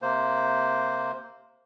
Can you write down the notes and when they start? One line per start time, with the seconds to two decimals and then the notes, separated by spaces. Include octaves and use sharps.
0.02 C3 A#3 C5